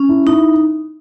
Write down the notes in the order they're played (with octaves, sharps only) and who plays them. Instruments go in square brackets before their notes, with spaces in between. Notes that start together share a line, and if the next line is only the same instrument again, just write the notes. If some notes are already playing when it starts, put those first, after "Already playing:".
Already playing: [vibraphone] C#4
[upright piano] E4
[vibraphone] D#4 [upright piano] E4